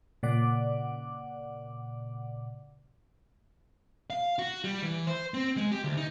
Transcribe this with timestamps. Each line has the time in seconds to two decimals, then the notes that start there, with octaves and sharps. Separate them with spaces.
0.23 A#2 C#3 D5 F#5 D6
4.10 F5
4.39 F#4
4.64 G3
4.82 E3
5.07 C5
5.34 C4
5.57 G#3
5.71 G4
5.84 D2
5.97 D#4